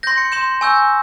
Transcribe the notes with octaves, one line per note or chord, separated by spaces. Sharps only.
C6 G6 A#6
C#7
C6 G6 E7
G#5 C#6 E6 G6